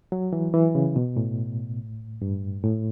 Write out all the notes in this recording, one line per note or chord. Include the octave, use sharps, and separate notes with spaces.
F#3
E3
E3
C#3
B2
A2
G2
A2